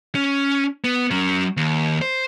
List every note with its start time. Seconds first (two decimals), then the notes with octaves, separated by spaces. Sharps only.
0.15 C#4
0.84 B3
1.11 F#3 C#4
1.57 D#2
2.02 C5